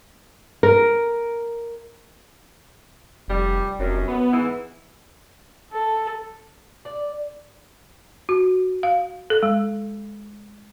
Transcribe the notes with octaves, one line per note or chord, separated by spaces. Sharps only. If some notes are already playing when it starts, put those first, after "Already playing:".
A#4
F1 G3
F1 F#2
B3
G#2 E3 E4
A4
D5
F#4
F5
A4
G#3